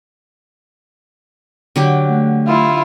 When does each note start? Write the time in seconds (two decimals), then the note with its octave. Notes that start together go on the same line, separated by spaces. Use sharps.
1.76 D3 F#3 G4
2.10 A3
2.47 E4 F4